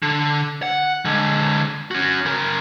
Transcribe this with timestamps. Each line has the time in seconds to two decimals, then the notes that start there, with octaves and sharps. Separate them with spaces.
0.03 D3
0.63 F#5
1.05 D3 G#3
1.91 C#4 F#4
2.26 C#3 A#4